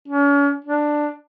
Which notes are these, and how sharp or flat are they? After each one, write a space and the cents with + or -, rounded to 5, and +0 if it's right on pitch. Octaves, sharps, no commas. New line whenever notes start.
C#4 +40
D4 +10